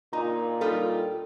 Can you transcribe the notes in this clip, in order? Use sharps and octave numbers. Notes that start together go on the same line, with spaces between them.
A#2 D#4 A#5
G3 D#4 F4 A4